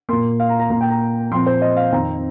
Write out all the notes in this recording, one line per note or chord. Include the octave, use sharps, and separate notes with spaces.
A#2 A#3 C6
F5
A#5
A#5
A#2 A#3 A#5
G5
A#5
A#2 F3 C4 C6
C5
D#5
F5
F2 D#3 C4 A#5